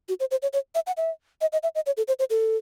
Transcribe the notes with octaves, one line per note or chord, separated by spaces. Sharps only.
F#4
C5
C5
C#5
C#5
E5
F#5
E5
D#5
D#5
E5
D#5
C#5
A4
C5
C5
A4